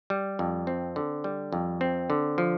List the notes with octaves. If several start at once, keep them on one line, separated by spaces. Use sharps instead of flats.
G3
F2
C4
D3
G3
F2
C4
D3
F3